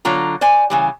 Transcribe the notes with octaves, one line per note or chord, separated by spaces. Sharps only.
D3 F#3 F4 A#5
C5 D5 G#5
C#3 E3 G3